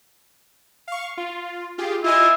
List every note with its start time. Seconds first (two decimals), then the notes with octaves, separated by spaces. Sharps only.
0.88 F5 C#6
1.17 F4
1.78 F4 G4 G#4
2.04 E4 F4 D#5 G#5